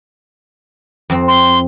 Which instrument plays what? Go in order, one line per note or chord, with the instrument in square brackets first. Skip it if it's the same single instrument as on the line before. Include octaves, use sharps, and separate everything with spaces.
[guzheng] F2 C4
[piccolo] C6